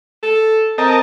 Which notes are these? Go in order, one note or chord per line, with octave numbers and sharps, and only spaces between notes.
A4
C4 A#4 D#5 A5